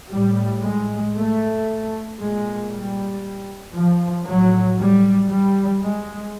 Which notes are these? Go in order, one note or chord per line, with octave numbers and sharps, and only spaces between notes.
A2 G3
G#3
A3
A#2 G#3
G3
F3
A2 F#3
G3
G3
G#3